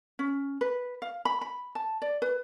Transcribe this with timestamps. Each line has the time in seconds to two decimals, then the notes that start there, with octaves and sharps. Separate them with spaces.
0.19 C#4
0.61 B4
1.02 F5
1.25 B5
1.41 B5
1.75 A5
2.02 D5
2.22 B4